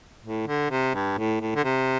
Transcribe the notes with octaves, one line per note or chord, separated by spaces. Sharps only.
A2
D3
C3
G2
A2
A2
D3
C3